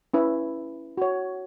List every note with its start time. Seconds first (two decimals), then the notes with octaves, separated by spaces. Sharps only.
0.14 C#4 E4 B4
0.97 F#4 C#5